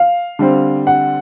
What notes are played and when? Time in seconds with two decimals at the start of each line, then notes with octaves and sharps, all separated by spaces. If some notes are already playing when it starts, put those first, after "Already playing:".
Already playing: F5
0.39 D3 G3 C4
0.87 F#5